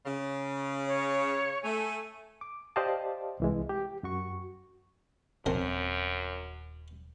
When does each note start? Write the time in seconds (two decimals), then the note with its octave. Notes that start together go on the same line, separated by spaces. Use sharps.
0.06 C#3
0.87 C#5
1.63 A3 G#5
2.41 D6
2.76 G4 C5 D5 D#5 F5 A5
3.40 C2 E3 G#3
3.69 G4
4.03 F#2 F#4 C#6
5.46 D#1 A#1 F#2 F3 C4 A#4